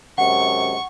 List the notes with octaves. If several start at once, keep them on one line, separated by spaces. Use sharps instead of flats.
F#2 C3 G#3 F#5 C#6